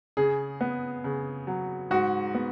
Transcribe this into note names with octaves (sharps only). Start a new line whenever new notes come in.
C#3 G#4
B3
C#3
F#3
G#2 F#4
B3